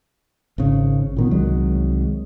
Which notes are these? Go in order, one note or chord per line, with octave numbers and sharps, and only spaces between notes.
G#1 C#3
A#2 D#3 B3
C2 D#3 F#3 G#3